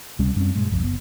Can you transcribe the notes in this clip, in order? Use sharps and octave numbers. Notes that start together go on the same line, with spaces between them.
C#2 C3 G3 C#4
F#2 G3 C4 C#4
G2 A#2 G#3
G1 C2 F2
F#1 B3